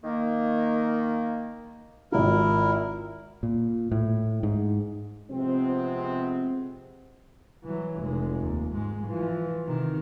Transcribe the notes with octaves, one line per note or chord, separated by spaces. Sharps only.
D#3 A#3
G#1 E4 F4 A#4
A#2
A2
G#2
C3 F3 G#3 B3 C4
E3 F#3
F1 G#3
D#2
G#2 G#3
E3 F3
C3 D#3